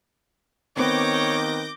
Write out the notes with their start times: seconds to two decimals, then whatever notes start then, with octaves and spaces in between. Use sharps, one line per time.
0.77 D#3 B3 C4 C#5 D6 G6 A#6